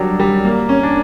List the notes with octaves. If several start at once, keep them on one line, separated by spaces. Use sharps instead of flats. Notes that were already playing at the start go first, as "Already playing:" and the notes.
Already playing: F#3 G3 D4
G3
A#3
C#4
D4